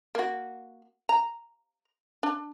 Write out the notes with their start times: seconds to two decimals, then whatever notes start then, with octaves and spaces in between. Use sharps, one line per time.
0.15 A#3 F#4
1.09 A#5
2.23 D4